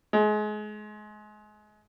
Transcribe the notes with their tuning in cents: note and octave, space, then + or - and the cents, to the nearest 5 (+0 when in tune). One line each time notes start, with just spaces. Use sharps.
G#3 +30